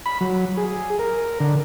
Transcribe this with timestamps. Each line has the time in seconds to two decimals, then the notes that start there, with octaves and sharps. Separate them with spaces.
0.06 B5
0.21 F#3
0.57 G#4
0.99 A#4
1.40 D3